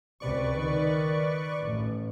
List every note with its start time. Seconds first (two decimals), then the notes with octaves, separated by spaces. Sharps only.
0.20 C#2 C3 B4 D5 C#6
0.55 D#3
1.61 A1